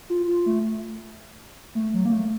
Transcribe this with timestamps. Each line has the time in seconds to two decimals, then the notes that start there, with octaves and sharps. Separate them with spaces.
0.10 F4
0.28 F4
0.46 A3
1.75 A3
1.94 F#3
2.05 A#3
2.12 A3